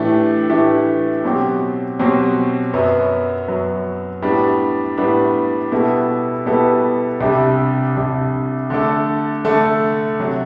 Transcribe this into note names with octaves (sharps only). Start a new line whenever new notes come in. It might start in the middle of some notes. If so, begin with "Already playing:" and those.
Already playing: A2 E3 A3 D4 G4
A2 E3 A3 D4 G4
B2 F#3 C4 G4
B2 F#3 C4 G4
F#2 F#3 B3
F#2 F#3 B3
A2 G3 B3 D4
A2 G3 B3 D4
B2 G3 B3 E4 A4
B2 G3 B3 E4 A4
C2 C3 G3 D4
C2 C3 G3 D4
D3 A3 D4 A4
D3 A3 D4 A4
C3 F#3